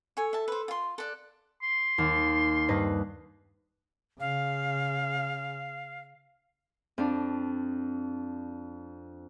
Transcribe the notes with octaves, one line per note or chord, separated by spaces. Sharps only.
A4 C#5 G#5
E5 A5
B4 C5
F4 C6
A4 D5 F#6
C6
D#2
G2 B4 D#5
C#3 F5
F2 D4